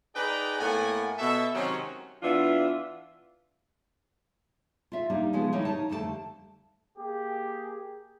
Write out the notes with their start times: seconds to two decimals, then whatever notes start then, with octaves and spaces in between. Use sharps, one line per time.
0.15 D#4 G#4 B4 D5 G5 A#5
0.59 A2 A#3 B3 F#5 G#5
1.19 B2 A4 E5
1.54 C3 D#3 F#3 G#3 C#4
2.22 E3 B3 D4 F4 E5
4.92 F4 E5
5.10 G3 A#3 D4 D#4
5.33 C#3 F3 G#3 B3
5.52 D#3 G3 D#4 E4 A#4 C#5
5.65 D#4 C#5 A5
5.89 F2 D3 G3 A3 F4 A5
6.98 A#3 G4 G#4